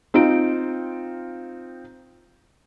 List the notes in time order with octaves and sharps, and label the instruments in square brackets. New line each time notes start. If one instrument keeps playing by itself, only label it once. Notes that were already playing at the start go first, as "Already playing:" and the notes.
[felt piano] C4 D#4 F4 D7